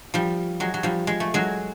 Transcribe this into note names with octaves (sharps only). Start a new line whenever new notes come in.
F3 G3
F#3 G#3
F#3
F3 G3
G#3
A3
F#3 G#3